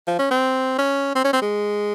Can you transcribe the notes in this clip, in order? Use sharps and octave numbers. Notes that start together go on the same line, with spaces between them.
F3
C#4
C4
C#4
C4
C#4
C4
G#3